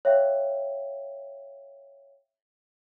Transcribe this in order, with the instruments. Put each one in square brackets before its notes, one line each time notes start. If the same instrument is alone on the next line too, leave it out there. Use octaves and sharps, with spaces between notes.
[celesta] C#5 E5 F5 G5